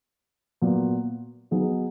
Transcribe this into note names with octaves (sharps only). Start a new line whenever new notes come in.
A#2 F#3 B3
F#3 B3 D#4 G#4